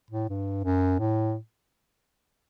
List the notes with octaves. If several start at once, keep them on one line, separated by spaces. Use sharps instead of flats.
A2
G2
F#2
A2